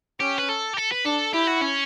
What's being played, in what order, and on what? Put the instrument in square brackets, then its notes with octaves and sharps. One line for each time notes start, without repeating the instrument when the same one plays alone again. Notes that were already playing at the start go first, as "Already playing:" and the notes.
[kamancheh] C#4 [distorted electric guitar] G4
[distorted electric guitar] B4
A4
G4
A4
B4
[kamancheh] D4 [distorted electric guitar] A4
[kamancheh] E4 [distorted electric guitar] G4
[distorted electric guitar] F#4
C#4